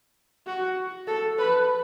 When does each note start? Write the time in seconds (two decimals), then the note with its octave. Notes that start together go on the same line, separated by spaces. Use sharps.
0.47 F#4
1.07 A4
1.39 B4